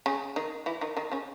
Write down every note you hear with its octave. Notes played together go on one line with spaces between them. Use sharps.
C#3 C#4
D#3 D#4
E3 E4
D#3 D#4
D#3 D#4
C#3 C#4